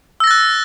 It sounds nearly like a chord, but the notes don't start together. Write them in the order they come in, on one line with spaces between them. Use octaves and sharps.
E6 A#6 A6 F#6